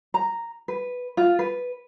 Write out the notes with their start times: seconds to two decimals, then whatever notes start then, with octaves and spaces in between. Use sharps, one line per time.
0.14 A#5
0.68 B4
1.17 F4
1.39 B4